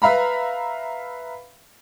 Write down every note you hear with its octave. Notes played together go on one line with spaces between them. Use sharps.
B4 E5 F5 A#5 B5